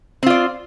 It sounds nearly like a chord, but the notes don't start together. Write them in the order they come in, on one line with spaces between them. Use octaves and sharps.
C4 F4 D5